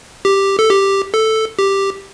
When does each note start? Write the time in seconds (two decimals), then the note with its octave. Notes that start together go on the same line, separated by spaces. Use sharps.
0.25 G4
0.59 A4
0.70 G4
1.14 A4
1.59 G4